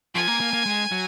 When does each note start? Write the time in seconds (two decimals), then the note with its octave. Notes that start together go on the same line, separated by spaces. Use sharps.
0.15 F3 G#5
0.28 A#3
0.40 A#3
0.53 A#3
0.66 G#3
0.92 F#3